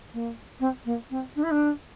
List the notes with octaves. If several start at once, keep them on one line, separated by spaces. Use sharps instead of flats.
A#3
C4
A#3
C4
D4
E4
D4